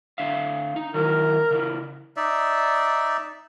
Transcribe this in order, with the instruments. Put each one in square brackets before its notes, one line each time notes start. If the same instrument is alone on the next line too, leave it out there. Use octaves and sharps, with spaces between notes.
[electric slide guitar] D3 E5 F5
D#4
[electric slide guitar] D#3 E3 F#3 [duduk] A#4
[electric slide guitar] C#3 E3
[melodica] D#4 D5 E5